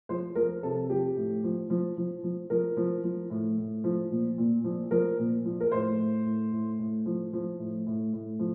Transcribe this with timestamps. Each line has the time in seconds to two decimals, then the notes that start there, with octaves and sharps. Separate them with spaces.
0.09 F3 C5
0.35 F3 A#4
0.63 C3 A4
0.90 F3 G4
1.16 A2
1.44 F3
1.70 F3
1.97 F3
2.23 F3
2.50 F3 A#4
2.77 F3
3.04 F3
3.30 A2
3.58 A2
3.84 F3
4.11 A#2
4.38 A#2
4.64 F3
4.91 F3 A#4
5.19 A#2
5.45 F3
5.60 A#4
5.72 A2 C5
5.99 A2
6.25 A2
6.52 A2
6.79 A2
7.06 F3
7.33 F3
7.59 A2
7.87 A2
8.13 A2
8.39 F3